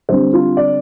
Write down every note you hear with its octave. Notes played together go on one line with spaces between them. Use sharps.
D3 G3 C4 C5
F4
D5